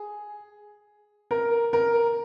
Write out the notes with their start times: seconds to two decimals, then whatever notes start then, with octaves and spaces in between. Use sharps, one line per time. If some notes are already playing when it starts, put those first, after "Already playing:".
Already playing: G#4
1.31 A#4
1.73 A#4